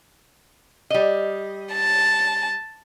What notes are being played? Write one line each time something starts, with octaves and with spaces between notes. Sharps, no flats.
G3 D#5
A5